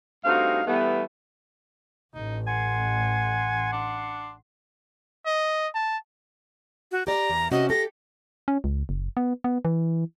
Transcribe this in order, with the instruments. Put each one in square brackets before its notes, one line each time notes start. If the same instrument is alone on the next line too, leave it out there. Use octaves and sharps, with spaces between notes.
[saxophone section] G2 A3 C4 D#4 F#4 F5
E3 G3 A3 B3
[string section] A1 [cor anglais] D#4
[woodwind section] F#5 C6 [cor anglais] G#5
[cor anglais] D4
[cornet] D#5
A5
[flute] F#4
[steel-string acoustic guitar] G4 D5 [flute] A#5
[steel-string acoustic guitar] E2
[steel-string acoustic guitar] C3 C#4 F#4 [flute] D#5
[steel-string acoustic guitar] G4 A4 [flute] A#6
[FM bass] C#4
C#2
F#1
B3
B3
E3